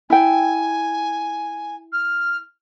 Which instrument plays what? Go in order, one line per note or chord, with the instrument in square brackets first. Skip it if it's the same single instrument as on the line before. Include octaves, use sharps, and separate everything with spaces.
[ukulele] E4 G5 [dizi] G#5
[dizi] F6